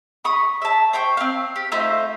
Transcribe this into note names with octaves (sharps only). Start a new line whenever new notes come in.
B5 C#6 D#6
E5 A5
C5 G5 C#6
C4 F5
G4
A3 D#4 F4 C5